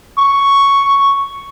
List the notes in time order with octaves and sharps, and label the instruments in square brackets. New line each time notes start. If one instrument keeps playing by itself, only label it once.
[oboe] C#6